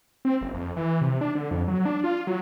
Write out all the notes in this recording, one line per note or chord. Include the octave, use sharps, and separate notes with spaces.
C4
F#1
F2
E3
C3
D4
D3
F2
F#3
D4
F4
F#3